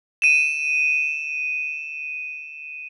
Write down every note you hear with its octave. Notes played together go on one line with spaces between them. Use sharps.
D#7 E7